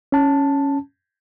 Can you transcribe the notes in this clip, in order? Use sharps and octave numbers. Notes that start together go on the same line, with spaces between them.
C#4 A5